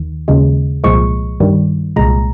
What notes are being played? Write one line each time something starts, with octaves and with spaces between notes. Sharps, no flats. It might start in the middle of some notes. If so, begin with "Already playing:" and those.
Already playing: D#2 D#3
D#2 C#3 G#3
C2 A#2 F3 G#3 C#6
G2 D#3 G3
C2 A#2 G#3 A#5